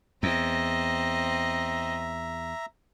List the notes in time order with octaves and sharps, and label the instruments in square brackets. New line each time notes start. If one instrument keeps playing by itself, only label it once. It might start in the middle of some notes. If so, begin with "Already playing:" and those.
[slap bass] E2 [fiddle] C4 D#5 [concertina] E5 A#5